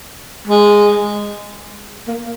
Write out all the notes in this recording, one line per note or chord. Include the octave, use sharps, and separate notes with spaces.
G#3
A#3